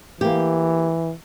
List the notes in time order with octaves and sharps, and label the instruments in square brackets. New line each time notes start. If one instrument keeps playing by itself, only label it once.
[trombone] E3 [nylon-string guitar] A#3 G4